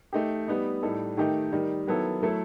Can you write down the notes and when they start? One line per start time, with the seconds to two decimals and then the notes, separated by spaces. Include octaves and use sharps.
0.13 A3 D#4 G4
0.48 G3 B3 D#4
0.83 A2 G3 D#4 A4
1.17 D#3 A3 D#4 G4
1.52 D#3 G3 D#4
1.87 D#3 F#3 B3 E4 A4
2.22 F#3 A3 E4 A4